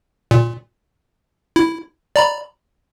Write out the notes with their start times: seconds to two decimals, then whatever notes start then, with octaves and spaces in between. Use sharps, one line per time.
0.31 A#2
1.56 E4
2.16 D5 A#5 B5